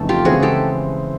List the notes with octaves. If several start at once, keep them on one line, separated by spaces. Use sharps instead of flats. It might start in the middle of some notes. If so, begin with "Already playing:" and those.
Already playing: F2 C#3 E3 A3 D#4 A4
F4 G4
C#3 E3 G#3 C4 F#4 G#4
G4 A4